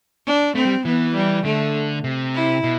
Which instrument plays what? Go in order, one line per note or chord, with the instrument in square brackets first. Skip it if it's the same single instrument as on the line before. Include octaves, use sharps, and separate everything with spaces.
[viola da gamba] D4
[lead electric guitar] A3 [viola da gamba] C4
[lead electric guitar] G3
[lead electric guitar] E3 [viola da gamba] B3
[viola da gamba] G3
[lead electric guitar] D3 [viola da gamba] A3
[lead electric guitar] C3
[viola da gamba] E4
[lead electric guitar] B2